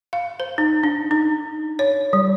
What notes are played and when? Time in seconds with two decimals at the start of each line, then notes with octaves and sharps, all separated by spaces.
0.13 F5
0.40 C5
0.58 D#4
0.83 D4
1.11 D#4
1.79 C#5
2.13 G3